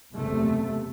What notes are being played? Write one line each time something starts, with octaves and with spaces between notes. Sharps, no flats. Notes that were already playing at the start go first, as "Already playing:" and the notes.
F#1 E2 C3 A3